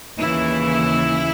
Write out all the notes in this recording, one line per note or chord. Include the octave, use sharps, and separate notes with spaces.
D#2 C#3 E3 E4